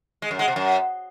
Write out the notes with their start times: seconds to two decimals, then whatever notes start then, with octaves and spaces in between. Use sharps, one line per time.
0.22 G#3
0.31 F#2
0.39 G#3
0.48 C3
0.56 F#2